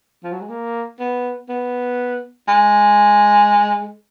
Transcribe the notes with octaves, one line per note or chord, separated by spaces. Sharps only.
F3
F#3
G#3
A#3
B3
B3
G#3